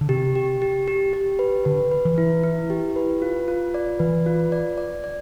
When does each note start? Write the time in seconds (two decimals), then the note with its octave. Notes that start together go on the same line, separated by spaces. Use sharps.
0.01 D3
0.09 C3 G4
0.35 G4
0.62 G4
0.88 G4
1.13 G4
1.39 B4
1.65 D3 B4
1.91 B4
2.05 E3
2.18 E4
2.44 E4
2.70 G4
2.96 B4
3.22 F4
3.48 F4
3.74 D5
4.00 E3 B4
4.26 F4
4.52 D5
4.78 D5
5.04 D5